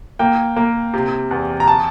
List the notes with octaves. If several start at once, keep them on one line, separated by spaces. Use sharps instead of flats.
A#3 G5
A#3
C3
E2
A#5
A5